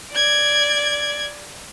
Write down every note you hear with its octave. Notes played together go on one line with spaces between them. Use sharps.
D5 G#6